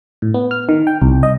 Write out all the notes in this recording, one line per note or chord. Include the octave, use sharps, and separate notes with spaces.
A2
B3
F6
D#3
G5
C2
D#5